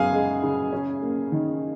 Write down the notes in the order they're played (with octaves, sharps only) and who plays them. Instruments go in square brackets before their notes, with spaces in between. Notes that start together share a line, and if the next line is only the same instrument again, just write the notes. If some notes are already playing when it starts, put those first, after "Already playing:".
Already playing: [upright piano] F#2 C#3 B3 [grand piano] G#4 F5 G#5
[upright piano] G#3
C#3
C#4
A#3
D#3